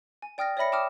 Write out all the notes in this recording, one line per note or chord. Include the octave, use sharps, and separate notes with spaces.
G#5
D5 G5 D#6 F6 A6 A#6
C#5 D5 E5 B5 A#6 C#7
G5 A5 D6 D#6 F6 E7